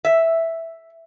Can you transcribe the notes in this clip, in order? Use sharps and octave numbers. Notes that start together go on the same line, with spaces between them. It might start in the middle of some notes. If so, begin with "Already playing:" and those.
E5